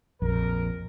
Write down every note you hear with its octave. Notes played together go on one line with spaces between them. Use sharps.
A#1 F2 A#4